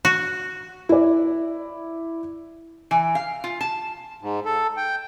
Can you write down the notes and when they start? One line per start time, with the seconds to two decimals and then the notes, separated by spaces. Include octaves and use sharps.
0.05 F#4
0.89 E4 D5
2.91 E3
3.15 F5
3.44 F4
3.61 A5
4.22 G#2
4.45 A4
4.77 G5